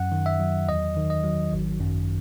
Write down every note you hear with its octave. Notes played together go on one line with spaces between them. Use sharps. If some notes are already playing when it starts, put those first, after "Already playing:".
Already playing: F#2 F#5
D#3
E5
F#3
E2 D#5
D#3
D#5
F#3
G#1
F#2